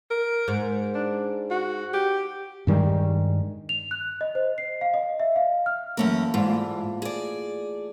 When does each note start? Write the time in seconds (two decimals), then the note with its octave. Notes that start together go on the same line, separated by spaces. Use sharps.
0.11 A#4
0.48 G#2
0.95 D4
1.51 F#4
1.94 G4
2.67 G2 D#3 G3 G#3
3.69 F7
3.91 F#6
4.21 D#5
4.35 C5
4.58 C7
4.81 F5
4.94 D#5
5.20 E5
5.36 F5
5.66 F6
5.97 F#2 E3 A3 A#3 C#4 A#4
6.34 G#2 E4 D5
6.47 A3 E4 F4
7.02 G#4 D5